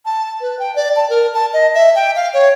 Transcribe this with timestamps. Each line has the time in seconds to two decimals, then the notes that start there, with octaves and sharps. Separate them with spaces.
0.06 A5
0.41 B4
0.59 G5
0.76 D5
0.96 A5
1.10 A#4
1.34 A5
1.53 D#5
1.74 E5
1.95 G5
2.16 F5
2.34 C#5